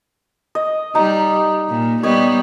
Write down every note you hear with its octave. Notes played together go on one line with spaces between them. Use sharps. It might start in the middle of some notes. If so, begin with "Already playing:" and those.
D#5
G3 D#4 A#5
A#2
G3 B3 C#5 D#5